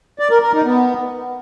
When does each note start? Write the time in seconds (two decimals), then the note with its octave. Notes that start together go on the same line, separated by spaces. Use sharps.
0.19 D5
0.31 A#4
0.42 A#4
0.53 D#4
0.65 B3